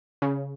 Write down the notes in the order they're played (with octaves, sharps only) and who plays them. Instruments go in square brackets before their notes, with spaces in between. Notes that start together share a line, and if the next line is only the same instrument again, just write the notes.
[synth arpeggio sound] C#3